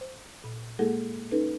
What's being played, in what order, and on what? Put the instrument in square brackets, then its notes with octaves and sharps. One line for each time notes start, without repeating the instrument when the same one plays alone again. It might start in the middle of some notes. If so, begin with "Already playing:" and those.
[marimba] C5
A#2
G#3 A#3 E4 G#4 A4 F#5
C#4 D#4 A4 B4